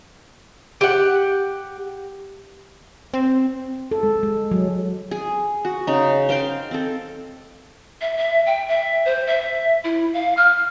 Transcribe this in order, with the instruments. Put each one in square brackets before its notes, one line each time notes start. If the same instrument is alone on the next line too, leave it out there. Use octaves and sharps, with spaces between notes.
[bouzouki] G4 F#5
[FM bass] C4
[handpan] A4
G#3
G#3
F#3
[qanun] G#4
F#4
C#3 D#4
C5 F5 G5 C6
C4 A4
[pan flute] E5
E5
G5
E5
C5
E5
E4
F5
F6